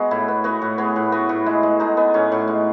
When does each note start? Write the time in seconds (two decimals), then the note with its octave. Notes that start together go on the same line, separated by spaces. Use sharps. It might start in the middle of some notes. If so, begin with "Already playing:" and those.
Already playing: G#3 B3 F#4
0.11 A2 E4
0.28 B3
0.44 B3 F#4
0.62 A2
0.78 B3 G#4
0.96 A2
1.12 B3 F#4
1.29 A2
1.46 G#3 E4
1.63 G#3
1.80 G#3 D#4
1.97 B3
2.14 A2 C#4
2.32 A2
2.48 G#3